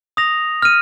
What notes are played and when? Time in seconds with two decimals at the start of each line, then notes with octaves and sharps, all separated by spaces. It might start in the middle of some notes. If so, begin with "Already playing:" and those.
0.17 D#6 A#6 F7
0.62 F6 D#7